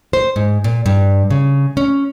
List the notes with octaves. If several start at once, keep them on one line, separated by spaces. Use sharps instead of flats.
C5
G#2
A#2
G2
C#3
C#4